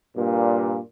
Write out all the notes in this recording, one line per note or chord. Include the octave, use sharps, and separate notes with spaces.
G2 A#2